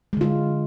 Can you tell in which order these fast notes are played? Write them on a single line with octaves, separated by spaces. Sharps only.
G#3 D3 F4